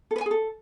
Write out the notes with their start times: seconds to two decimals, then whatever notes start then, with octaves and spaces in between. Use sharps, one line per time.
0.11 A4
0.16 B4
0.21 G#5
0.26 G#4
0.31 A4